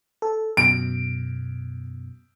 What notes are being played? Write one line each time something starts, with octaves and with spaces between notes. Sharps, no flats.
A4
F#2 B2 D7